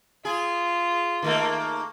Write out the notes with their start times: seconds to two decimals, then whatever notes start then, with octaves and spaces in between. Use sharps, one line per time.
0.25 F4 G#4
1.22 D#3 A3 A#3